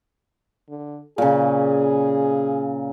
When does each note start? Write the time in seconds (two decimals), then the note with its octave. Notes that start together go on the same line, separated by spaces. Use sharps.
0.69 D3
1.18 A#2 C#3 G#4